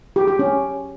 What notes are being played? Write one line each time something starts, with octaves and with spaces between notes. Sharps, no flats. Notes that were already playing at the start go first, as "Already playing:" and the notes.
G4
G4
C#4